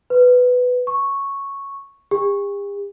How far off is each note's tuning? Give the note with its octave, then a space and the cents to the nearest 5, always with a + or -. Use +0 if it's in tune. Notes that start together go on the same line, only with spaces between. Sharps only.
B4 +10
C#6 -5
G4 +45